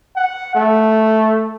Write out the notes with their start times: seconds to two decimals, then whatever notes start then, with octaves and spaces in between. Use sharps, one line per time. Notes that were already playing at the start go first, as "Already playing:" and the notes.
0.16 F#5
0.55 A3